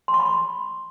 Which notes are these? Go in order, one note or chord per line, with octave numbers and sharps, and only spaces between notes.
C6
C#6
B5
C#6